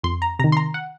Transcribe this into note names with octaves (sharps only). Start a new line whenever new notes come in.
F2 C6
A#5
C3 D#3 A#5
C6
A#5
F#5